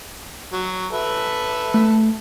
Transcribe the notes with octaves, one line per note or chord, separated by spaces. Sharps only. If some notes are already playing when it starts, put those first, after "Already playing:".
F#3
A4 B4 E5
A3